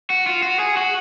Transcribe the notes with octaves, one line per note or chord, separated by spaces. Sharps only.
F#4
F4
F#4
G#4
F#4